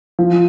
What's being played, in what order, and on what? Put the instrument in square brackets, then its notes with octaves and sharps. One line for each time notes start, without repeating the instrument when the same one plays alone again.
[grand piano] F3